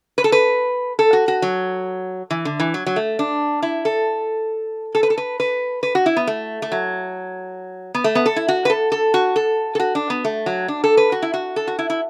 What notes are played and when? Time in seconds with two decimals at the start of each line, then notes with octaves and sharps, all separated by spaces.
0.18 B4
0.24 A4
0.32 B4
0.99 A4
1.13 F#4
1.28 F#4
1.42 F#3
2.30 E3
2.45 D3
2.60 E3
2.74 F#3
2.86 F#3
2.96 A3
3.19 D4
3.63 E4
3.85 A4
4.95 A4
5.03 B4
5.10 A4
5.18 B4
5.40 B4
5.83 B4
5.95 F#4
6.06 E4
6.17 B3
6.27 A3
6.62 A3
6.72 F#3
7.95 B3
8.04 A3
8.15 B3
8.26 A4
8.36 E4
8.48 F#4
8.65 B4
8.70 A4
8.92 A4
9.14 F#4
9.36 A4
9.75 A4
9.80 F#4
9.95 D4
10.10 B3
10.25 A3
10.46 F#3
10.68 D4
10.84 A4
10.97 B4
11.12 F#4
11.22 E4
11.34 F#4
11.56 A4
11.67 F#4
11.79 E4
11.90 E4